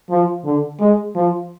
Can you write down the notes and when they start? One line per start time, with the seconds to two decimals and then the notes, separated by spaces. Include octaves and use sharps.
0.10 F3
0.45 D3
0.80 G#3
1.16 F3